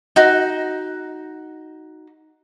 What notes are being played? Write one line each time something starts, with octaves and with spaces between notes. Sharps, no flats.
D#4 F#4